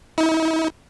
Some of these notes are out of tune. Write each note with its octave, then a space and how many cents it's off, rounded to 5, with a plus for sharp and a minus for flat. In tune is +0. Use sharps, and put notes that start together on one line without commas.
E4 -45